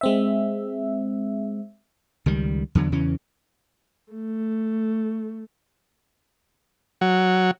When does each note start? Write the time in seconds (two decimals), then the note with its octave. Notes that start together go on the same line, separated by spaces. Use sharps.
0.01 G#3 C4 E5
2.26 C#2 D#3 G3
2.75 E2 D3 F#3
2.92 E2 C#3 E3 C#4
4.13 A3
7.01 F#3